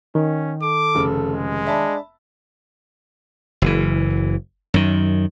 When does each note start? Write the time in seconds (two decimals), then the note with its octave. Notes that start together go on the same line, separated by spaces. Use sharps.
0.15 D#3 C#4
0.62 A4 D6
0.95 F1 C#3
1.33 G#3
1.67 D4 E5 A5 B5
3.62 F#1 E3
4.74 F#2 D#3